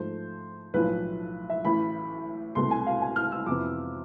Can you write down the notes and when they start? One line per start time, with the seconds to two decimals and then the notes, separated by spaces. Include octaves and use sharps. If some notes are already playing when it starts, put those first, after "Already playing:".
Already playing: G#2 F3 A3 C5
0.74 B1 A2 F3 B4
1.50 E5
1.65 A1 A2 E3 B5
2.55 C2 B2 A3 C4 C6
2.71 G#5
2.87 F5
3.02 G#5
3.16 F6
3.32 E6
3.46 F2 C3 E3 B3 D6